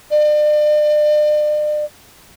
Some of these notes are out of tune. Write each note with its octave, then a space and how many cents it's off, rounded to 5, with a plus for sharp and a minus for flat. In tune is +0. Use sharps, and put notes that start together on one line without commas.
D5 +40